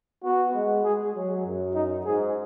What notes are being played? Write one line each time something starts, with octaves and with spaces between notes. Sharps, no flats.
B3 F#4
G#3
G#3 G#4
F#3
F#2
D#4
G#2 G#4